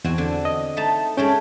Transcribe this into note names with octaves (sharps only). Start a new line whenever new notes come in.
E2 C4 F#4 G#5
D3
D#5
A3 D#4 A5
G#3 A3 C#4 G5